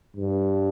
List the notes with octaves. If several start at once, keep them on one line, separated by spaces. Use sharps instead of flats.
G2